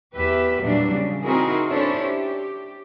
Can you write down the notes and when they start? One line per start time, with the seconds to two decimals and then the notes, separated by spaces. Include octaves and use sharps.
0.15 E2 G4 B4 E5
0.61 A#2 E3 F#3 G3 D4
0.90 C#3
1.24 C4 D#4 E4 F#4 G#4 A#4
1.68 C#4 D4 E4 A4 C5 C#5
2.00 G4